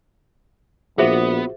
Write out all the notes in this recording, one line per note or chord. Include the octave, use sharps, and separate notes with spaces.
A#1 B3 F4 F#4 G#4 C5 E5